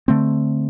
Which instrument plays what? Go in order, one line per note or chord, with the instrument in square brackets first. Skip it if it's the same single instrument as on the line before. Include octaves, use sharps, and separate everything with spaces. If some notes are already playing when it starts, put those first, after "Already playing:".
[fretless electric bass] D3 A3 C4